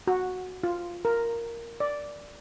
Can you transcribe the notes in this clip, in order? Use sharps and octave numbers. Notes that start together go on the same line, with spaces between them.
F#4
F4
A#4
D5